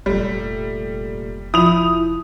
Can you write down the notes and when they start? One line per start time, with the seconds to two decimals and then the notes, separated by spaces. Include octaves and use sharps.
0.06 F1 A#2 G3 A3
1.54 F3 E4 D#6 F7